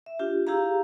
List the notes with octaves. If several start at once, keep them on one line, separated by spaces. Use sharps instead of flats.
E5
D4 F4 G4
E4 G4 G#4 F5 A#5